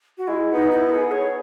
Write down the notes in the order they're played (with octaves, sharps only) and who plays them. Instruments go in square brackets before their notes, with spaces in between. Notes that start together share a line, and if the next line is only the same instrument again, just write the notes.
[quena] F#4
[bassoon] G#3 [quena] E4
[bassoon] B3 [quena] D#4
[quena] D#4
E4
A#4
G#4
C#5